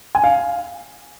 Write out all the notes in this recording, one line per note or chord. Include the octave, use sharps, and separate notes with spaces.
G#5
F5